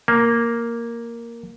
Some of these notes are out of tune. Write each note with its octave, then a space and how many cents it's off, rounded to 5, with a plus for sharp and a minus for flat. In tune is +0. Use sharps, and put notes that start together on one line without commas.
A#3 +0